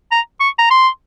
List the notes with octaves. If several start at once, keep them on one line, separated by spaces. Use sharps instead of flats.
A#5
C#6
A#5
C6